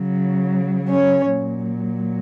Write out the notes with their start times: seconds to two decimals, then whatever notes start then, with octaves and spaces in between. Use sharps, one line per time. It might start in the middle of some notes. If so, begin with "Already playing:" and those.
Already playing: C#3 F#3
0.89 C#4 C#5
1.29 A#2 F#3